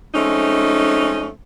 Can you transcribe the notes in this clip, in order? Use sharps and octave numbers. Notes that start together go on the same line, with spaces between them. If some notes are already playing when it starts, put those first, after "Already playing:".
F3 G#3 A3 C4 C#4 D#4